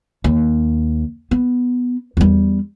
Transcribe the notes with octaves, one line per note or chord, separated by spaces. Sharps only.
D#2
B3
E2 G3